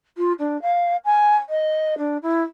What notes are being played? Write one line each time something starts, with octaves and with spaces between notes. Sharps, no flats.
F4
D4
F5
G#5
D#5
D4
E4